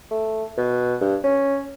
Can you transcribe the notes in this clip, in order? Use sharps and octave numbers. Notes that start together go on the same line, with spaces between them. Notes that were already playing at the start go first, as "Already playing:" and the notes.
A3
B2
G2
C#4